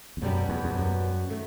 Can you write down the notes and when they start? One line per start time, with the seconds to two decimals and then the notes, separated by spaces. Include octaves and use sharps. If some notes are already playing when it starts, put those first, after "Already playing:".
0.17 E2
0.22 F#2 B2 G3 B3
0.49 E2
0.64 E2
0.75 F#2
1.29 D#3 A3